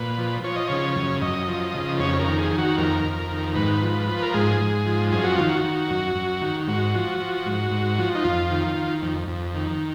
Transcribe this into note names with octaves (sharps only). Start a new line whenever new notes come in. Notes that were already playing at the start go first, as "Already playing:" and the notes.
Already playing: A#2 B4
F3
F3 C#5
D#5
C#3 C#5
F#2
F#2 D#5
F3
C#3
F2 C#5
A#4
D#3
G#4
D#3
F#4
F2 A#4
F2
D#3
G#2 B4
F3
F3
A#4
G#2 G#4
G#2
F3
F#2 G#4
F#4
D#3 F4
F#4
D#3
F#2
F#2
D#3
G#2 F#4
F3
F3
G#2
G#2
F3
D#4
F2 F4
D#3
D#3
F2
F2
D#3